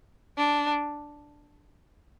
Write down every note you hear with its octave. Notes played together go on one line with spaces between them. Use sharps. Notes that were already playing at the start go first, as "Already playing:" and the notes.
D4